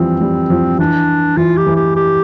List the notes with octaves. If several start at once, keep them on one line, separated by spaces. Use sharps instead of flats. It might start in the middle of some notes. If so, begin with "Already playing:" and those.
Already playing: E3 F3 G3 C4
G3
F3
E3 D4
E3 F4
G4
E3
G4
G4